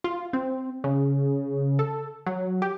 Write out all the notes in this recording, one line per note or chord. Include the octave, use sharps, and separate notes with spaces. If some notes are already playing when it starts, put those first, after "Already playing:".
F4
C4
C#3
A4
F#3
G4